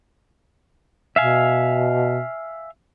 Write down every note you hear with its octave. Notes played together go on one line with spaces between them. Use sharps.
B2 E5 F5 G#5